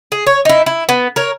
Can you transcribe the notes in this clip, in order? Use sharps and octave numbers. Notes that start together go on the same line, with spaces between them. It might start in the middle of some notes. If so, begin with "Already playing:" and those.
G#4
C#5
D#4 E4
E4
B3
A#4 C#5